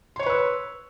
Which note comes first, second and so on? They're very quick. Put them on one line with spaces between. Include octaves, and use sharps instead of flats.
C6 C#5 C#6 B4 E6